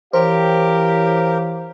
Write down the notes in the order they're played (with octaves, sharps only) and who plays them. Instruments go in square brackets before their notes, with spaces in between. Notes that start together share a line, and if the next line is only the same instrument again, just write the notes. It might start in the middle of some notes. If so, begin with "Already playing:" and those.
[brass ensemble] E3 C#5 F5 [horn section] G4 [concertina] A#4 [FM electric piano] C5